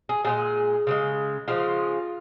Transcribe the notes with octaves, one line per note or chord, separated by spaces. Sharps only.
G#4
A#2 F3 G#3 G#4
C#3 F3 G#3
C#3 F3 G#3 F4